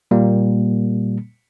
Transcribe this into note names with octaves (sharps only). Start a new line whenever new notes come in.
A#2 G3 A#3